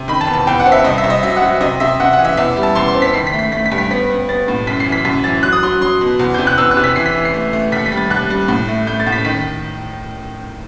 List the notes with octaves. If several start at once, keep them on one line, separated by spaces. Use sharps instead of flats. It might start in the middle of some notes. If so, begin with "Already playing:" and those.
Already playing: C3
D#3 B5
A5
E2
A5
E2 G5
F#5
C4
E5
C2 D#5
E5
C2
D#5
F#3 E5
F#5
F#3
C3 D#5
C3 E5
C3 F#5
F#5
E3
E5
E2 E5
G3
A5
E2 C6
C6
C4
B6
D#3 C7
B6
A3
B6
A3 B6
B6
G2
B6
B3 B6
B3
B3 A6
A2
F#2 B6
C7
E3
B6
F#2 B6
E3 A6
F#3 F#6
D#6
F#3 C6
F#3 C6
B2
E2
C3 G6
F#6
E2 E6
F#6
C3
B6
E3 C7
B6
E3
C7
A3
A3
D#2 B6
B6
G3
A6
D#2 F#6
G3
A2
A3
A3 G6
A6
A2
B6
D#3 B6